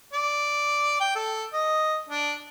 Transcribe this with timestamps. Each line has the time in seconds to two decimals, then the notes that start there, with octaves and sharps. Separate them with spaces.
0.13 D5
1.00 G5
1.16 A4
1.53 D#5
2.09 D4